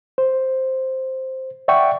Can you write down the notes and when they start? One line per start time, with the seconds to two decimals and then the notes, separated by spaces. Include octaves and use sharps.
0.18 C5
1.68 D5 E5 F#5 G5 C#6